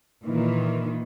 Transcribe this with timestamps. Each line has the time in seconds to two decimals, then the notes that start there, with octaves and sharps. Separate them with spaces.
0.23 A#2 D#3 E3